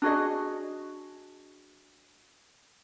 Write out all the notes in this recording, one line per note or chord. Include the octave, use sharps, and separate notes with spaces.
D4 F#4 G#4 D#5